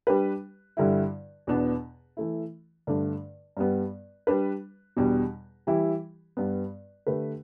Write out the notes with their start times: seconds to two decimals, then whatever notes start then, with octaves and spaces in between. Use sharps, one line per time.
0.07 G3 D4 G4 B4
0.77 G2 D3 G3 E4
1.47 E2 B2 B3 D4
2.17 E3 A3 E4
2.87 G2 D3 A3 D4
3.57 G2 G3 B3
4.27 G3 D4 B4
4.97 E2 B2 G3 D4
5.67 E3 G3 E4 G4
6.37 G2 G3 B3
7.07 D3 A3 G4 B4